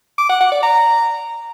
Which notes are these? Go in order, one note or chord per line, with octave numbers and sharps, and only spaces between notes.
D6
F#5
F#5
D5
A#5